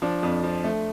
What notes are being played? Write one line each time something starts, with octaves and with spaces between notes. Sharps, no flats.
F3 D4
F2
F3
A3